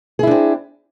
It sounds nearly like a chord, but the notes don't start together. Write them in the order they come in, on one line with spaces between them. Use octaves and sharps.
G#4 E4 D4 C4